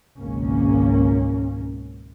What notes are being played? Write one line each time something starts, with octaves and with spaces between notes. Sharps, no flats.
G#1 C#2 B2 A#3 C#4